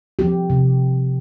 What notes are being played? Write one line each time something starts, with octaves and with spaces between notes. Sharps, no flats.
F3 C4 G4
C3